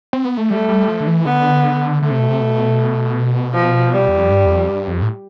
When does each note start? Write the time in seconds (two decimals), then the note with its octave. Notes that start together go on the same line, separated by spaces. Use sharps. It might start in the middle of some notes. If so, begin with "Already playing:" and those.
0.13 C4
0.25 B3
0.37 A3
0.51 G3 A3
0.69 G3
0.88 F3
1.00 D3
1.07 E3
1.26 D3 B3
2.02 D3 A3
2.11 C3
2.19 B2
2.28 C3
2.41 B2
3.54 F3
3.93 G3
4.08 E2
4.19 F2
4.31 G2
4.46 E2
4.50 F2
4.69 G2
4.88 F2
5.02 A2